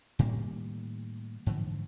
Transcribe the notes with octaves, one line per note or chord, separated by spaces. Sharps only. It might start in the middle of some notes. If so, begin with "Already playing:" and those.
A2 D#3 G3 A#3
G#2 D3 E3 F3